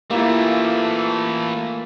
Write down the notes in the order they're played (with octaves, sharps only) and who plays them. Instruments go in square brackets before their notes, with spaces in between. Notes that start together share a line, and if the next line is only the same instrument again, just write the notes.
[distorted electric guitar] E3 A3 [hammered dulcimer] A#3 F4 [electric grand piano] E4 G4